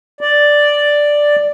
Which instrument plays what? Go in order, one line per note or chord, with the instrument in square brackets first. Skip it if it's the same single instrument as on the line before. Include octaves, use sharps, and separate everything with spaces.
[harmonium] D5